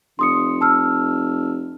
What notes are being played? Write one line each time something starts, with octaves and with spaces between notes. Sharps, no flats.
F1 C6 D#6 C#7
A5 E6 F6